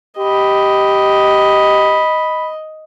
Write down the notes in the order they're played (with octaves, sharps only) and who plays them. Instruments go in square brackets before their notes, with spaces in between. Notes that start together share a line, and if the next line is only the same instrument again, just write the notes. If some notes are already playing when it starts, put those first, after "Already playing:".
[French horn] G4 [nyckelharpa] D#5 [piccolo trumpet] B5